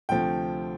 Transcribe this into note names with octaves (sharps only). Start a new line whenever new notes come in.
D2 C3 F3 A3 G5